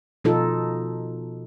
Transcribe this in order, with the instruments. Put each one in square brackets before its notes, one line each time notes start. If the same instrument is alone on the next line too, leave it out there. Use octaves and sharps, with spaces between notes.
[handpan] B2 F3 D#4 F4 A4